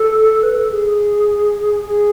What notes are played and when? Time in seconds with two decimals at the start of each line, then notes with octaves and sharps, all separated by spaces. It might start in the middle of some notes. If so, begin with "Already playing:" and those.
Already playing: A4
0.43 B4
0.57 A4
0.72 G#4
1.85 G#4